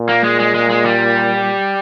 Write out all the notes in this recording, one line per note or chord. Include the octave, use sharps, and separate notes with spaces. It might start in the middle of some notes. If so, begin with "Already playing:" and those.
Already playing: A#2
A#3
G#3
G#3
G#3
G#3
G3